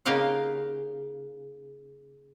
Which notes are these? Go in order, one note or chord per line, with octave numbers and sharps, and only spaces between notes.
C#3 A#3 D#4 G4 F5 F#5